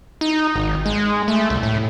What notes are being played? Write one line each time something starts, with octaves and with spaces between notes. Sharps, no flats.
D#4
G#1
G#3
A3
C2
A2